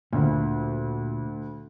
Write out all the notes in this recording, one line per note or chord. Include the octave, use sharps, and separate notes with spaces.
D2 A#2